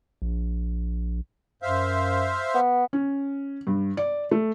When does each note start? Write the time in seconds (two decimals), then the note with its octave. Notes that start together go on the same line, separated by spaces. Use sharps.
0.22 A#1
1.62 F#2 C5 E5 F5
2.54 B3
2.93 C#4
3.67 G2
3.97 D5
4.31 A3